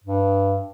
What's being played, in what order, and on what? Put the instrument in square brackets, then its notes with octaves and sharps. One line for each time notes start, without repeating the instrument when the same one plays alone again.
[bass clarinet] G2